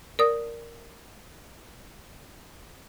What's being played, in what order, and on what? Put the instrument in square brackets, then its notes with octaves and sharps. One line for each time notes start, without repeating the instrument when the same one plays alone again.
[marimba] A#4 D5 D#6